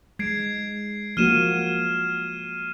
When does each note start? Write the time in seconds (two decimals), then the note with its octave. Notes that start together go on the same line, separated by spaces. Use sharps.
0.19 G#3 G#6 C7 D7
1.17 F3 A#3 F#4 F6 D#7 E7